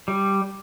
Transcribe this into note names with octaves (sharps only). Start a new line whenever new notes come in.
G3